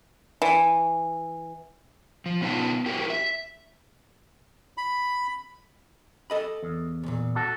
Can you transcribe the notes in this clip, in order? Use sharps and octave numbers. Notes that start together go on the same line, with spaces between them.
E3
F3
B2 B3 C#4 D#4 F4 A5
E4 F#4 G4 A#4
E5
B5
A4 D#5 B5
E2
D2 A#2
F#4 A4